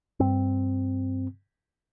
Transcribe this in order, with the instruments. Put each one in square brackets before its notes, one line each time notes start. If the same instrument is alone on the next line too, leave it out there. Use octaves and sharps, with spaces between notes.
[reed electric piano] G2 [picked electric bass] C4